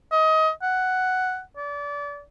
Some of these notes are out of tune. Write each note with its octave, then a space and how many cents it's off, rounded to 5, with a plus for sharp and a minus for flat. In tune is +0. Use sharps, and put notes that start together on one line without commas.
D#5 +25
F#5 +5
D5 -30